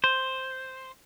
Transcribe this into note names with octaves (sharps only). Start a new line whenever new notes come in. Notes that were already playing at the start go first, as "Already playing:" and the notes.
C5